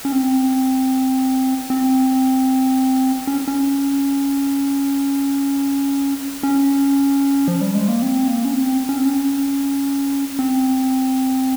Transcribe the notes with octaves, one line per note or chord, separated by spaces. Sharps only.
C#4
C4
C4
C#4
C#4
C#4
F3
G3
G#3
A#3
C4
A#3
C#4
C4
C#4
C4
C#4
C4